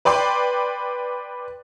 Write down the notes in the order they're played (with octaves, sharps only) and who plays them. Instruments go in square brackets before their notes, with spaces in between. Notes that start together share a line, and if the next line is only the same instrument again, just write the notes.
[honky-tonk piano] B4 D5 G5 C6